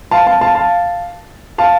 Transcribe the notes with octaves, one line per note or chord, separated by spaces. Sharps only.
F5 A5
F5 A5
F5 A5
F5 A5
F5 A5